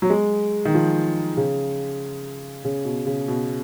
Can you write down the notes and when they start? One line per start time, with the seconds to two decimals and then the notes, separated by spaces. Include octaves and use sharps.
0.02 F#3
0.10 G#3
0.65 D#3
0.74 F3
1.37 C#3
2.65 C#3
2.85 B2
3.07 C#3
3.28 B2